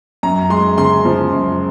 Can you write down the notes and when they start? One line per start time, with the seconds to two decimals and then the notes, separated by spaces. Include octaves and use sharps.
0.23 F#2 A#5
0.50 G#3 C6
0.78 C#3 C6
1.05 F3
1.32 F#2